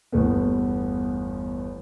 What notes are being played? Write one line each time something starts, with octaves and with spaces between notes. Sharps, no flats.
G1 E2 A3 B3